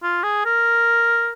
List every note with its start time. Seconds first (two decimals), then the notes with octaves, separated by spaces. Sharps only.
0.03 F4
0.23 G#4
0.45 A#4